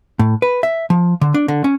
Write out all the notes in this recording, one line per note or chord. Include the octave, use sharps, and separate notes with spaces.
A2
B4
E5
F3
D3
D4
D3
C#4